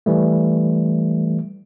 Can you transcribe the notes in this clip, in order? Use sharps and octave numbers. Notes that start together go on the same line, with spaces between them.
E3 G3 A3